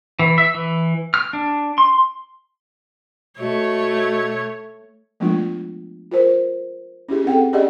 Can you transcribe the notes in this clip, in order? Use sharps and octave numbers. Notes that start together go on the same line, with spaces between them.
E3
E5
E3
F6
D4
C6
B2 A3 C#5
F3 G#3 A3 B3 D4 F4
F4 A#4 C5
C#4 E4 G4 G#4
C4 A4 F#5 G5
C#4 G4 G#4 D5 D#5 F#5